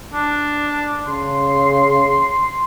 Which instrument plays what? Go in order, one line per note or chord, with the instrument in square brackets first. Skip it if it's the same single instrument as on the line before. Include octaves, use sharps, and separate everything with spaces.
[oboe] D4
[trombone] C#3 [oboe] C6